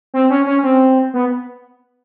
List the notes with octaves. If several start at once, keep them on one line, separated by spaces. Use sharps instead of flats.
C4
C#4
C#4
C4
B3